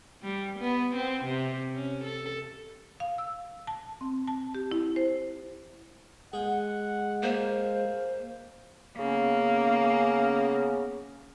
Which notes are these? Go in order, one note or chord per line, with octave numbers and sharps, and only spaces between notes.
G3
B3
C4
C3
C#4
A4
F5
E6
A5
C4
A5
G4
E4
C5
G#3 G#4 F#5 G5
A#3 G#4 C5 F5
C#3 A#3 B3 C#4